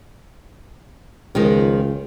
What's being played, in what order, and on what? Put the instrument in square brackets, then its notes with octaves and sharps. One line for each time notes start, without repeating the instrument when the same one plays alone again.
[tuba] C#2 [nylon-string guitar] D#3 F3 G#3